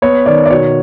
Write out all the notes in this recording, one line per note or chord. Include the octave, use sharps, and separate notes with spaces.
B3 C#5
D#3 D5
D5
B2 C#5